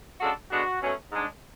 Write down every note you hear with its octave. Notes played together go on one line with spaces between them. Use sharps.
C#3 G#3 D4 F#4 A4
D3 G#3 B3 D4 F#4
B2 F#3 A3 C#4
G#2 G#3 D4